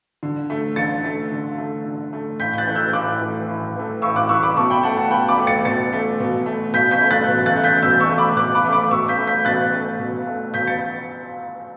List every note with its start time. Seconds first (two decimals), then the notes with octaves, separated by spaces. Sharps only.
0.23 D3
0.50 A3
0.76 D3 A6 C#7
1.05 A3
1.31 D3
1.58 A3
1.86 D3
2.13 A3
2.40 A2 G6 B6
2.53 G6
2.58 F#6 A6
2.67 E3 A3
2.75 E6 G6
2.93 A2 D6 F#6
3.21 E3 A3
3.49 A2
3.76 E3 A3
4.02 A2 C#6 E6
4.16 D6 F#6
4.29 E3 A3 C#6 E6
4.43 B5 D6
4.57 B2 A5 C#6
4.70 G5 B5
4.83 A3 F#5 A5
4.97 F#5 A5
5.11 B2 G5 B5
5.29 B5 D6
5.38 A3
5.47 A6 C#7
5.65 B2 A6 C#7
5.93 A3
6.20 B2
6.46 A3
6.73 B2 G6 B6
6.91 G6 B6
7.01 A3
7.11 F#6 A6
7.28 B2
7.46 F#6 A6
7.55 A3
7.64 G6 B6
7.82 B2 E6 G6
8.00 C#6 E6
8.09 A3
8.18 B5 D6
8.36 B2 D6 F#6
8.55 B5 D6
8.64 A3
8.73 B5 D6
8.91 B2 C#6 E6
9.08 G6 B6
9.19 A3
9.27 G6 B6
9.45 B2 F#6 A6
9.72 A3
9.99 B2
10.27 A3
10.54 B2 G6 B6
10.67 A6 C#7